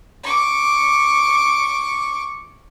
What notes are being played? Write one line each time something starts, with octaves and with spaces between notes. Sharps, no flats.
C#6 D6